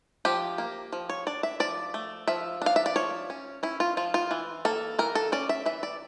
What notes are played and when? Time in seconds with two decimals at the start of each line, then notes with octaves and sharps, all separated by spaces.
0.25 F3 G4
0.58 A#3
0.93 F3
1.09 C#5
1.27 D4 D5
1.43 E5
1.60 F3 D5
1.94 A3
2.28 F3 E5
2.62 D4 F5
2.76 E5
2.86 D5
2.96 F3 C#5
3.30 C#4
3.63 C#4 E4
3.80 F4
3.97 F3 F4
4.14 F4
4.31 E3
4.65 A#3 A4
4.99 E3 A#4
5.15 A4
5.32 C#4 D5
5.49 E5
5.66 E3 E5
5.83 D5